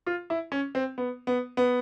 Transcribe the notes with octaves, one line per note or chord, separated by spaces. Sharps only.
F4
E4
C#4
C4
B3
B3
B3